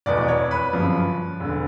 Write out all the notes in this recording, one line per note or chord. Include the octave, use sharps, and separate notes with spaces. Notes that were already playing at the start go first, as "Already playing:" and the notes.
F1 E2 B2 D5
C#5
B4
G1 F#2 C#3 F3
E1 D3